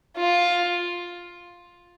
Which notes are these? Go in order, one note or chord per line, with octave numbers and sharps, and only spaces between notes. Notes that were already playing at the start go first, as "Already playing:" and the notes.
F4